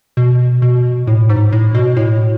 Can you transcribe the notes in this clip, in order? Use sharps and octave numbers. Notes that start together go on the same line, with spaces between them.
B2
B2
A2
G#2
A2
B2
A2